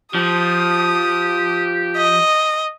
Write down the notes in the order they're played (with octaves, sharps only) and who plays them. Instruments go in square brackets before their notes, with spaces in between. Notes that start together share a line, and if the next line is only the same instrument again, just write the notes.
[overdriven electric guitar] F3 [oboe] G4 [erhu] D#6
[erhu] D#5